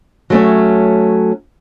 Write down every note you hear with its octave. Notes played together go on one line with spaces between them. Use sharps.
F#3 A3 C#4